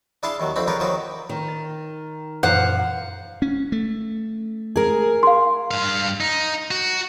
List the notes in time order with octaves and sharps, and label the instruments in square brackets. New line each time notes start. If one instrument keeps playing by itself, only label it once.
[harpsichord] D4 E4 G#4 F5 A5 C6
D#2 D#3 F#3
F2 A3 C4 D4 B5
C#4 F4 G4 G#4 A#4 B4
D#3 F3 F#3 C#4 G4 G#4
[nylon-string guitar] D#3
[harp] A6
[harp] F#2 A#2 E3 [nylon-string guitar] C5 F5 [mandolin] F#5
[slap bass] C#4
A3
[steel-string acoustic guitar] G#4 A#4
[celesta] F5 C6
[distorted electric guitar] G2 F5
D#4
F#4